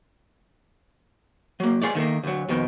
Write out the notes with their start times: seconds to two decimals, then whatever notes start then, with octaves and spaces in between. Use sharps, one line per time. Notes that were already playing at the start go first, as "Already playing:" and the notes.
1.60 F#3 A#3
1.82 F4 G#4 C#5 D5
1.95 D#3 A3 A#3
2.23 D2 F#3
2.49 F2 B2 D#3